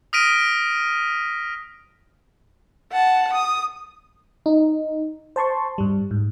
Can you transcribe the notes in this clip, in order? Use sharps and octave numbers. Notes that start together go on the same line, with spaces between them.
D#6 F6 A#6 B6 D7 D#7
F#5 A5
D#6
D#4
C5 A5 C6 C#6
G2 G3
G#2